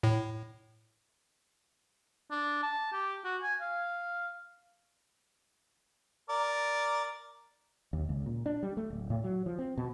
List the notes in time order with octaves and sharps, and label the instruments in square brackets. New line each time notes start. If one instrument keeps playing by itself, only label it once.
[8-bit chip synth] A2
[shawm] D4
A5
G4
F#4
G#5
F5
[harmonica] A#4 D5
[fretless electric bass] D#2
C#2
A#2
D4
G3
A3
D1
A2
F#3
F3
C4
B2